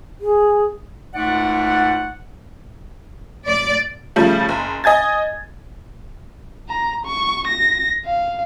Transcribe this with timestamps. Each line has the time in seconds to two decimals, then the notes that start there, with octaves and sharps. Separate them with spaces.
0.21 G#4
1.14 C#2 G#2 A3 D5 F#5
3.48 D5
4.16 C#3 F3 G3 A3
4.49 F#1
4.84 D#5 G#5 G#6 A6
6.69 A#5
7.06 C#6
7.48 A#6
8.05 F5